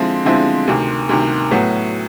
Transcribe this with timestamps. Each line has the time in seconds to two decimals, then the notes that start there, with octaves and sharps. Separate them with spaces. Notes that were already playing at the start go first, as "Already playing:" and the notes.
Already playing: D3 F3 G#3 C4 E4
0.25 D3 F3 G#3 C4 E4
0.67 D2 C3 D#3
1.09 D2 C3 D#3
1.51 A2 F#3 B3